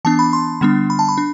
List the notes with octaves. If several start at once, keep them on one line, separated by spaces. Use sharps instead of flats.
E3 B3 D4 A5
B5
C6
D3 G3 B3 D4
B5
A5
B5
D4